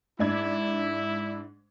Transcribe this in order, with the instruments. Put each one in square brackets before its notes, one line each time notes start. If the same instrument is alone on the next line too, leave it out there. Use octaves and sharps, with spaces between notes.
[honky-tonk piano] G#2 D4 G#6 [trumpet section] E4